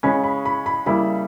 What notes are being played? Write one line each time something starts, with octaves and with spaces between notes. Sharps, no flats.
C#3 G#3 C#4 B5
B5
B5
B5
C#3 G3 A#3 E4 B5